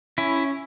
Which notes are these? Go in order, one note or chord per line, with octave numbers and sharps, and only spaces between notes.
C#4 E4